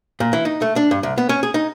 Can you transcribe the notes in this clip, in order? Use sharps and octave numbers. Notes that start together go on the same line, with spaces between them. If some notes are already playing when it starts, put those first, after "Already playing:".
A#2
E3
D#4
A3
D4
G2
C2
B3
C#4
G#4
D#4